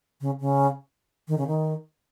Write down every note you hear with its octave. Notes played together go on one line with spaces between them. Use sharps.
C#3
C#3
D#3
C#3
D#3